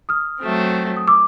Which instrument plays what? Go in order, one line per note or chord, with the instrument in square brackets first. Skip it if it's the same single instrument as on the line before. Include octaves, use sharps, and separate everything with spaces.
[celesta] D#6 F6
[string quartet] F#3 A3 C4
[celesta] D#6
D6 E6